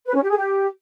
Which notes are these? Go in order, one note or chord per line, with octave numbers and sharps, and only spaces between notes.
B4
C#4
G4
G#4
G4